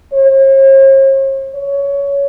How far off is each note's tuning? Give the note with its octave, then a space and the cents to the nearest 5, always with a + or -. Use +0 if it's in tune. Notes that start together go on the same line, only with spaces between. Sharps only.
C#5 -45
C#5 +15